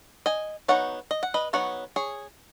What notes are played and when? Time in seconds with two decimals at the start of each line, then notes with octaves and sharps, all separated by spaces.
0.26 D#5 G#5
0.68 F#3 B3 D#4 C#5 F#5
1.11 D#5
1.23 F#5
1.34 B4 D#5
1.53 F#3 B3 D#4 C#5 F#5
1.96 G#4 C#5